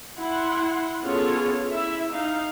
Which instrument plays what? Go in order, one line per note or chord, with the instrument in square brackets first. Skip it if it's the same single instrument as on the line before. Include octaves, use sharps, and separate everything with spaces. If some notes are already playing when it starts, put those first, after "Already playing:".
[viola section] E4 F#5 C6
B3 C#4 F4 G#4 A4 C#5
E4 E5
D#4 F5